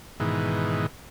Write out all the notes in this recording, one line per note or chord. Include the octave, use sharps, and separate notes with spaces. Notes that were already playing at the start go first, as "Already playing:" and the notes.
G#2 B2 D#3 E3